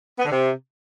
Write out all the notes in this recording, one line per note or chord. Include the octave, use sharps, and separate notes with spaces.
B3
D3
C3